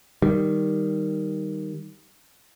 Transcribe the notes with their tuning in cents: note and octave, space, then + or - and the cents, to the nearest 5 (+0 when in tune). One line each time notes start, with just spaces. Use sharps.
D#3 +0 G3 +0